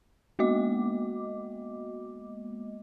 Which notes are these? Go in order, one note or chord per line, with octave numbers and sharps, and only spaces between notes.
G#3 A#3 B3 F#4 D#5 D6